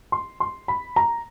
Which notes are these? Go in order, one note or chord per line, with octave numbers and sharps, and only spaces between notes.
C6
C6
B5
A#5